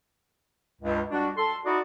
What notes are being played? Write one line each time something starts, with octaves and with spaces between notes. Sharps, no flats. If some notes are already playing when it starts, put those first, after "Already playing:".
C#2 G2
G3 D4 F#4
A4 C6
D#4 E4 F#4 D5